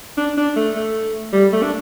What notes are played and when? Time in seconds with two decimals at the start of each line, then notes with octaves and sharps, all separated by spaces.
0.17 D4
0.37 D4
0.56 A3
0.76 A3
1.33 G3
1.52 A3
1.63 D4